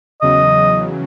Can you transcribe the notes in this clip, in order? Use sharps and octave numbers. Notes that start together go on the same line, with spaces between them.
E2 C#3 F#3 D#5